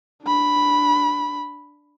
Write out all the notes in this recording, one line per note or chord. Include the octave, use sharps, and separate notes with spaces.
D4 B5